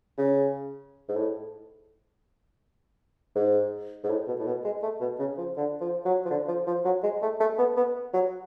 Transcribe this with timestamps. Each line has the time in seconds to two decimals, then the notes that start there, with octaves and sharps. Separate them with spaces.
0.18 C#3
1.09 G#2
1.16 A2
3.35 G#2
4.04 G#2
4.10 A2
4.28 B2
4.39 A2
4.46 B2
4.65 G#3
4.83 A3
5.01 B2
5.19 C#3
5.38 F3
5.57 D3
5.81 F3
6.05 F#3
6.25 F3
6.30 D3
6.48 F3
6.67 F3
6.85 F#3
7.03 G#3
7.22 A3
7.40 A3
7.58 B3
7.77 B3
8.13 F#3